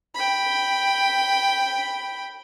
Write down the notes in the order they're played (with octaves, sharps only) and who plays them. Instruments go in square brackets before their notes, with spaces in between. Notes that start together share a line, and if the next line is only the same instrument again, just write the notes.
[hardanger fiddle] G5 B5